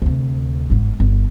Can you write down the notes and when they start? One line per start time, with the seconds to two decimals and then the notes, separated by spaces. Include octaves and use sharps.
0.02 D2 C3
0.70 G1 G#2
1.00 G1